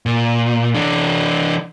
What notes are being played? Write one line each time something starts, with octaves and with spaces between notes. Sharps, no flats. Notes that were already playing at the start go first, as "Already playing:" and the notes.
A#2
E3 D4